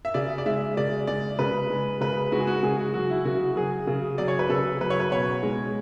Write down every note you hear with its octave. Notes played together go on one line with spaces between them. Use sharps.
E5
C#3 D5
D5
G#3 E5
C#3 D5
G#3 D5
C#3 B4
G#3
C#3 B4
G#3 F#4
G#4
F#4
C#3 G#4
F#4
F#3 F#4
E4
C#3 F#4
F#3 G#4
C#3
F#3 D5
C#5
B4
C#3 A4
F#3 B4
C#5
B4
B2 C#5
G#3